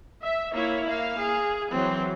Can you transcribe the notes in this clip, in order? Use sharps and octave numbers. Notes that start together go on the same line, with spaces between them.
E5
A#3 E4 C#5
A#3 F5
G#4
E3 F#3 C4